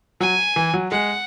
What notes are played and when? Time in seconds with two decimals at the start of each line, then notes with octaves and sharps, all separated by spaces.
0.20 F#3 G#5
0.56 E3
0.74 F#3
0.91 G#3 F#5